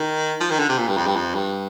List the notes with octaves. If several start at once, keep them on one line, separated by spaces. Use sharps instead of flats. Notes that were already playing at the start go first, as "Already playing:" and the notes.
Already playing: D#3
F3
D#3
D3
C3
A#2
G2
F2
G2
F2
G2